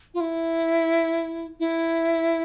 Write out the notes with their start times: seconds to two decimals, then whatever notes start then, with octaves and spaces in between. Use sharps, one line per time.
0.14 F4
0.21 E4
1.60 E4